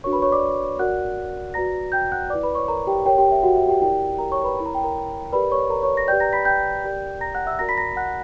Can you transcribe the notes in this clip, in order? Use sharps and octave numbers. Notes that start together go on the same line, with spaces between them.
D4 F#4 A#4 C#5 C#6
B4 B5
C#5 C#6
D5 D6
F#4 A#4 D5 F#5 F#6
F#4 B4 D5 A#5 A#6
G5 G6
F#5 F#6
E4 B4 D5 D6
B4 B5
C#5 C#6
A#4 A#5
G4 G5
G4 A#4 C#5 G5
G4 G5
E5
F#4 F#5
E5
G4 G5
E4 G4 A#4 D5 G5
A#4 A#5
C#5 C#6
B4 B5
E4 A#4 C#5 B5
A#5
G5
A#4 A#5
G4 A#4 B4 D5 B5
C#5 C#6
A#4 A#5
C#5 C#6
A#6
G4 B4 D5 G5 G6
A#5 A#6
B5 B6
G5 G6
G4 A#4 D5
A#5 A#6
F#5 F#6
E5 E6
F#4 A#4 D5 A#5 A#6
B5 B6
A#5 A#6
F#5 F#6